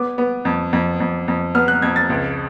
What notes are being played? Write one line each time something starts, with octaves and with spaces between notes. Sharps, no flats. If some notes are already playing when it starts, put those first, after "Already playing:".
Already playing: B3 D6
B3
F2
F2
F2
F2
B3 F6
F#6
F2 G#6
A6
C#2